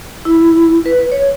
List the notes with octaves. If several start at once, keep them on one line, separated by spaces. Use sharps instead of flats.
E4
B4
C#5